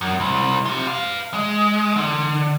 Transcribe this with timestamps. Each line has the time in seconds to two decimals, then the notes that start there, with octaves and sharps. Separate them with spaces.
0.01 F#2
0.20 C2
0.66 F4 G4
0.87 B4 F5
1.34 G#3
1.96 D3